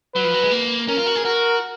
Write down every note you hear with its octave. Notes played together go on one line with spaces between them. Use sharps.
F#3 B4
F3
F#3
G#3
A#3
C#4 A#4
F4
F#4
G#4
F#4 A#4